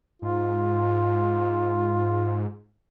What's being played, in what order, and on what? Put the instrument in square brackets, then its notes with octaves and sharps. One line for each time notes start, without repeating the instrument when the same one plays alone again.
[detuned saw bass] G#2 [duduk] F4